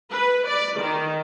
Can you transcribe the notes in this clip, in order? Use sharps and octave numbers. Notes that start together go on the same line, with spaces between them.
B4
D5
D#3